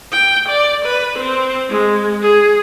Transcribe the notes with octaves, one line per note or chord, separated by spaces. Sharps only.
G5
D5
B4
C4
G#3
G#4